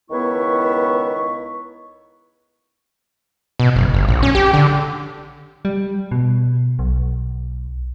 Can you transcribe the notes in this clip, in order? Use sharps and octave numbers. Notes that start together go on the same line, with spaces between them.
C#2 D#3 B3 E4 B4 C#6
B2
F#1
G1
A#1
C#4
G4
D3
G3
B2
B1